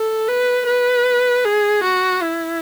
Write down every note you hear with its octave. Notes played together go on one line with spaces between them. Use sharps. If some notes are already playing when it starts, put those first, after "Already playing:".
Already playing: A4
B4
B4
G#4
F#4
E4